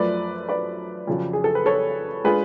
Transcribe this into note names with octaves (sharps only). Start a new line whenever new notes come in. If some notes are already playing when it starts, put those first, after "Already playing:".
Already playing: F#2 F3 A3 B4 D5
B4 D5
F2 C#3 F#3
G#4
A4
B4
A4 C#5
G#3 D4 F4 G#4 B4